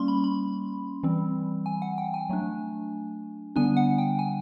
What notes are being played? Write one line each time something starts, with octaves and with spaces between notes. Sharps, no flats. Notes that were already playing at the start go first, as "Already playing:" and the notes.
Already playing: G3 A#3 C#4 C6 C#6
B5
B5
E3 G3 C4
G#5
F#5
G5
G#5
F#3 A3 D4
D3 G3 B3 D4 G#5
F#5
G5
G#5